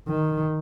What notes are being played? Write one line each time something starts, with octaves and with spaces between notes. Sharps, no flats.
D#3